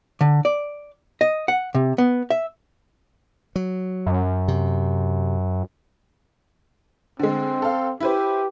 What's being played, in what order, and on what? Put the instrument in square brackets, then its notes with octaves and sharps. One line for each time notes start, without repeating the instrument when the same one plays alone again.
[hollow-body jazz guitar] D3
D5
D#5
F#5
C3
B3
E5
[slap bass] F#3
[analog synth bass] F#2
[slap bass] C3
[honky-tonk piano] D3 G#3 [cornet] C4
[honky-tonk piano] A4 F5
[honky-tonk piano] E4 B4 C5 [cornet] G4